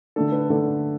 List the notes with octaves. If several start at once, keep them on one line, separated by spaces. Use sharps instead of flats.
D3 A3 D4 A4
B4
D3 A3 D4 A4